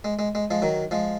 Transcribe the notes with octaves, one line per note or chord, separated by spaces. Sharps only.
G#3
G#3
G#3
F3 G#3
D#3 F#3
F3 G#3